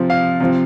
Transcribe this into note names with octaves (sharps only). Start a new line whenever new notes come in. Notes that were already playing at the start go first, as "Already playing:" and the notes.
Already playing: C3 F3
F5
C3 F3